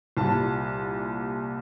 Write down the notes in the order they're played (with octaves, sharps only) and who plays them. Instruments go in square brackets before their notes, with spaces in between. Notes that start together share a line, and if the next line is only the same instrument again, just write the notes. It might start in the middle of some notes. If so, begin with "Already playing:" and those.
[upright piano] C2 A#2 G3 A5